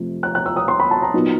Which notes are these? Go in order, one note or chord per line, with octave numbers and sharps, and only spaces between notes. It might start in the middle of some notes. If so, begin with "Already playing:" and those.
Already playing: F2 C3 F3 A3
F#6
F#6
E6
D#6
C6
B5
A5
A#5
A#2 F#3 B3 D#4